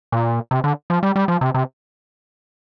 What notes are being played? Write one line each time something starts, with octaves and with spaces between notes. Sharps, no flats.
A#2
C3
D3
F3
G3
G3
F3
C3
C3